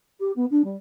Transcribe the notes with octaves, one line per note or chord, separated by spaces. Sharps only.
G4
B3
D4
G3